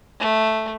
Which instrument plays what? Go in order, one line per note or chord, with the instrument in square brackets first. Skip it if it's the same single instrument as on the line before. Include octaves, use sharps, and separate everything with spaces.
[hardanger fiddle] A3